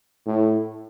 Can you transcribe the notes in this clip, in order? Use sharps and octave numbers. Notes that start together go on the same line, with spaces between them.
A2